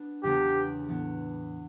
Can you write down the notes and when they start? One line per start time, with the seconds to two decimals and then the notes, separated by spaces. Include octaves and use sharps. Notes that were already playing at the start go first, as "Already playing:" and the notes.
Already playing: B3 D4
0.23 E2 C#3 E3 B3 D4 G4
0.89 A2 E3 B3